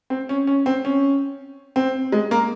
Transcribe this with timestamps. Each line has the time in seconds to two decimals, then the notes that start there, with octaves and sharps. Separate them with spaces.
0.10 C4
0.29 C#4
0.47 C#4
0.66 C4
0.85 C#4
1.76 C4
2.12 G#3
2.31 A#3